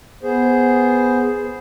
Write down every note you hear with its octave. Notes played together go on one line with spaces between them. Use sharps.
B3 G#4 C5